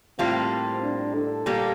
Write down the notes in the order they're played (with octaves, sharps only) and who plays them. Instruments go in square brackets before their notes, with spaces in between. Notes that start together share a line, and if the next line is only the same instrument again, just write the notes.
[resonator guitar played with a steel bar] A2 G3 A#3 F4 [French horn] C4
[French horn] D4
A4
[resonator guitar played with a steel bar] A#2 G3 A#3